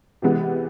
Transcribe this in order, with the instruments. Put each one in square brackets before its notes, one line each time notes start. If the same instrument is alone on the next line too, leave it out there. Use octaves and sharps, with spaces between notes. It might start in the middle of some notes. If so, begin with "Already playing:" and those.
[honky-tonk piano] C3 E3 G#3 B3